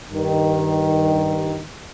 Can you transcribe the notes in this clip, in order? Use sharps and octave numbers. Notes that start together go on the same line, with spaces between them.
G2 D#3